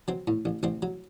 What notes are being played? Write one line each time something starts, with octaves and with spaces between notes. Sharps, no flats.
F#3 C4
A2
A1
A1 C4
F#3